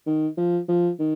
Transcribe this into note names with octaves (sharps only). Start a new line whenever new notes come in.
D#3
F3
F3
D#3